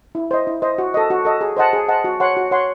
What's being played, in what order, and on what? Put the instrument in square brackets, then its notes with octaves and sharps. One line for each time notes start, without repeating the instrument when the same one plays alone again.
[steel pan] E4
C5 D#5
E4
C5 D#5
F#4
A4 D#5
F#4
A4 D#5
G#4
C5 D#5 F#5 A5
G#4
C5 D#5 F#5 A5
F#4
C#5 F#5 C6
F#4
C#5 F#5 C6